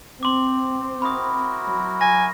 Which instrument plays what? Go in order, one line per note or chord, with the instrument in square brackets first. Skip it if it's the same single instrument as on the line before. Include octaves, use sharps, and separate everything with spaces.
[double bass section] C4 [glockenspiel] C6 D6
[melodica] E4 F#4 A#4 [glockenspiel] B5 D#6
[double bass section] F#3
[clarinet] G#5 [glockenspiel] A#6